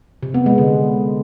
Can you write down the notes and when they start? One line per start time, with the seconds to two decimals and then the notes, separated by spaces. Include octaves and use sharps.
0.23 C3
0.34 B3
0.46 G#3
0.58 D3